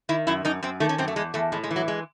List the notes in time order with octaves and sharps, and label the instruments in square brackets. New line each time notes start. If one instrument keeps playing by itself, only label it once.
[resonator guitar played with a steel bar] D#3 E4
F#2 E4
F#2 D#4
F#2 C4
D#3 A3
C#4
F#2 C4
A3
E2 G#3
E2 A3
A2 G#3
G#3
E3
F#3
G#3